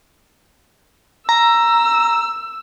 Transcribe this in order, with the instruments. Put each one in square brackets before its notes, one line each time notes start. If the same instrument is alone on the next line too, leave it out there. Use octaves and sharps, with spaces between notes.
[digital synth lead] A#5 [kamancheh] E6